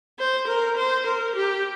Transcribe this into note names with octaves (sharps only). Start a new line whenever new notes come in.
C5
A#4
C5
A#4
G4